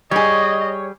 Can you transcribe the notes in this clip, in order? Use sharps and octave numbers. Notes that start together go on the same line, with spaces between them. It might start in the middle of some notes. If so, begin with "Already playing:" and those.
G3 G#4 C#5 D#5